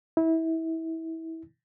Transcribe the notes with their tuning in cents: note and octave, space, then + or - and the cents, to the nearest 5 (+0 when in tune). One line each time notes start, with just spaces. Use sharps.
E4 -25